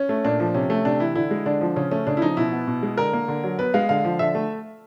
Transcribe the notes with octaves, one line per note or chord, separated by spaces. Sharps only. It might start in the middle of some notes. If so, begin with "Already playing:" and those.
Already playing: C#4
A3
A#2 D4
F3
C3 C#4
A3
C3 D4
E3 E4
D3 E4
G#3
D3 D4
F3
C#3 C#4
A3 C#4
C#3 D4
E4
F3 D#4
B2 E4
B3
B2
G#3
D3 A#4
A#3
D3
F#3
B3 B4
G#3 F5
D3 F5
F3
D3 E5
A3